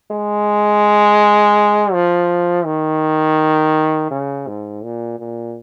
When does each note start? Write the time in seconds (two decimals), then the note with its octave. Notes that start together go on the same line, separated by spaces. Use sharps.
0.11 G#3
1.93 F3
2.65 D#3
4.11 C#3
4.47 G#2
4.84 A#2
5.19 A#2